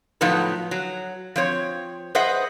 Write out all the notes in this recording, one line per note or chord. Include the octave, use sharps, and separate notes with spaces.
A2 F3 F#3 B3 D#4 A4
F#3
F3 C4 C#5
G#4 B4 C5 D#5 E5 F#5